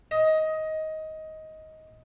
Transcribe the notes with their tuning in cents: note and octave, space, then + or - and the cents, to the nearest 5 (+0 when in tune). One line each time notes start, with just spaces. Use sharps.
D#5 +15